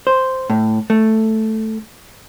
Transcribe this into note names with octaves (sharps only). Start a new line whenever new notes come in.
C5
A2
A3